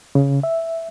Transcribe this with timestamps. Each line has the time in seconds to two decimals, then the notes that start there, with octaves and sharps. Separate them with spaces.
0.15 C#3
0.43 E5